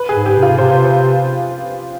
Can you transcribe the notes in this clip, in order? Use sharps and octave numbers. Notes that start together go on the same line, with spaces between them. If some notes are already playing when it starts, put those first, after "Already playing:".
Already playing: B4
G#4
G#2
G4
C3
F4
C3 C5
B4
C5